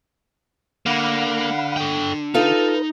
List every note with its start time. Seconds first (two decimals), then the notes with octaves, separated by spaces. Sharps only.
0.86 D3 A#3 F5 F#5 B5
1.76 A4 G5
2.34 D#4 F4 A4 B4 D#5